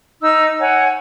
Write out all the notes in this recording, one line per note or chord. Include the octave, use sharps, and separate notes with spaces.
D#4 E6
C#5 F#5 G#5